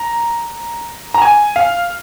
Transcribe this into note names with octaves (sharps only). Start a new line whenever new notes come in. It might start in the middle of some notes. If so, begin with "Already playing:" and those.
Already playing: A#5
A#5
G#5
F5